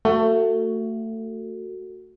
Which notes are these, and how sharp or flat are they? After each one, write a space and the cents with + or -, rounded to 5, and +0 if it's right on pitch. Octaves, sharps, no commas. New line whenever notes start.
A3 +25 F#4 +0